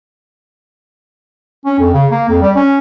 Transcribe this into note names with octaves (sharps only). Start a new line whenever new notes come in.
C#4
F2
C#3
A#3
F2
G3
C#4